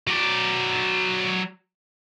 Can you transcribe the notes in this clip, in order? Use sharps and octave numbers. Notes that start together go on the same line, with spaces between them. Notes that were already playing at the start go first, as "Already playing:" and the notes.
F#3 D5